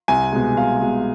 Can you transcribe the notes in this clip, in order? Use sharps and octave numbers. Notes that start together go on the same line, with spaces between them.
C2 G#5
B2 G#3
C2 F5
B2 G#3